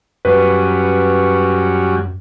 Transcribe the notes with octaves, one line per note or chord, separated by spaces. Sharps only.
F#2 F#3 G3 C#4 B4